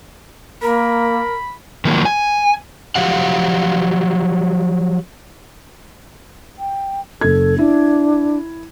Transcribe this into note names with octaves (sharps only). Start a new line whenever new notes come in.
A#3 A#4 B5
D#3 F3 F#3 A#3
G#5
F3 F#3 G4 F5 F#5
G5
F#1 A4 G#6
D4 E4